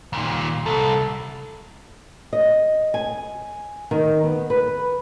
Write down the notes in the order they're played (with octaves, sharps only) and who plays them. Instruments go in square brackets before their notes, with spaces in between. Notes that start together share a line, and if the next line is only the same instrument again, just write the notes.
[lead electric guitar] D#2 A#2
[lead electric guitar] C2 [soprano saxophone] A4
[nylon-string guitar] D#5
G#5
D#3
B3
B4